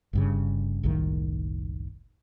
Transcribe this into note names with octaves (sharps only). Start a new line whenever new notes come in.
G1 G2 C#3
F#1 C2 A2 D#3